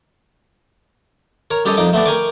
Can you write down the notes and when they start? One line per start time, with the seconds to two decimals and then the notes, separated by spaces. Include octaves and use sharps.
1.51 A#4 C#5
1.65 G3 C#4 G4 A4 C#5 D#5
1.77 F2 D#4 D6
1.93 A3 B3 D5
2.06 A#4 G5 G#5 C#6 D6